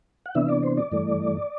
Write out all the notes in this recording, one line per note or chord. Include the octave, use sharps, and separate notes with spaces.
F#5
C3 E3 B3 D4 E5
D5
C5
D5
G2 E3 A3